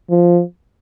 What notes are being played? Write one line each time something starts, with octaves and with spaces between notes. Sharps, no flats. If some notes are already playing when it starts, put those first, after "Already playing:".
F3